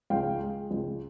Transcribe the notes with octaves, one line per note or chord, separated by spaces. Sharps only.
C#2 F5 G5
G#3
C#2